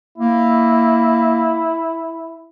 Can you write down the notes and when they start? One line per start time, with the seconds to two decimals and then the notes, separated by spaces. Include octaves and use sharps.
0.18 A#3 E4